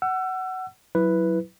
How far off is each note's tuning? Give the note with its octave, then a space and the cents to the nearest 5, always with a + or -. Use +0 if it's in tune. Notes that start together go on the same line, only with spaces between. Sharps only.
F#5 +15 E6 +30
F#3 +0 E4 +0 B4 +0